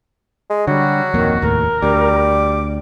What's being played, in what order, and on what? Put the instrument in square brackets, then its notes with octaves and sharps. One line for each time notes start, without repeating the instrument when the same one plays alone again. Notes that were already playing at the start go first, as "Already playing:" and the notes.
[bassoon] G#3
[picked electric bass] D3 [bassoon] F#3 [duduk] G3 [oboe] F#4
[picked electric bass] D1 F2 A#3 [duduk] D#3
[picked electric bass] F1 D#2 A2 [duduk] A#4
[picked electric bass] D2 [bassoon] G3 [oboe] D6